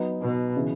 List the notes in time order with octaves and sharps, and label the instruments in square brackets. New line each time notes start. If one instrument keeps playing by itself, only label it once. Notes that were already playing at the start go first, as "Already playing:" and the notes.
Already playing: [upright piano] F#3 B3 D#4
[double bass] B2
[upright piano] C#3 E3